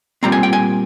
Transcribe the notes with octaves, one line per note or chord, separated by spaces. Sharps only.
A#2 G3 C4 A#5
G#5
G5
G#5